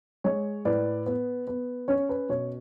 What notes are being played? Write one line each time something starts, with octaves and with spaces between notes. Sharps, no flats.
G#3 C#5
A2 B4 D5
B3
B3
C#4 C#5
B4
B2 C#5